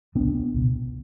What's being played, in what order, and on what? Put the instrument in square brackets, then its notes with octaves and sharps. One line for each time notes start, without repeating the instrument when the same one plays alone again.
[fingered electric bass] C#2 B2 B3 D4
C#2 B2